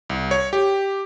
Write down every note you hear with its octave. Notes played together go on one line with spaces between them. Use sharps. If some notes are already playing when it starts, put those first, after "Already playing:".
C2
C#5
G4